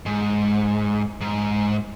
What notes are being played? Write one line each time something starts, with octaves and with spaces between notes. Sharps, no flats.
G#2
G#2